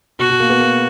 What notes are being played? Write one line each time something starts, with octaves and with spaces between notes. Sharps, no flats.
B2 F#4
B2
A#3
B3
A#3